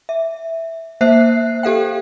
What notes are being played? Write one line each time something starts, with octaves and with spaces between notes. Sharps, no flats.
E5
A#3 C5 E5 F#6 C7
G4 A4 F5 G5